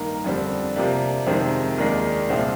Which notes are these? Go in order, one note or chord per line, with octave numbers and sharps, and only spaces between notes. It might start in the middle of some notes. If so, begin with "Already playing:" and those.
Already playing: G2 D#3 A#3 D#4
F2 D3 G3 C4
C3 F3 A#3 D4 G4
F2 C3 D#3 G#3 C4
D#2 D#3 G#3 D4
C2 A#2 F3 C4 F4